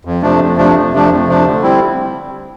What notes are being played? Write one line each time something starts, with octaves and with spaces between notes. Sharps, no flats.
F2
C3 F3 A3 D4
F2
C3 F3 A3 D4
F2
C3 F3 A3 D4
F2
C3 F3 A3 D4
D3
G3 C4 E4